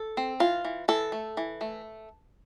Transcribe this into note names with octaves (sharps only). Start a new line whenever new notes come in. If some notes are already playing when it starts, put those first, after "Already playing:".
Already playing: A4
C4
E3 F4
E3
E3 A4
A3
E3
A3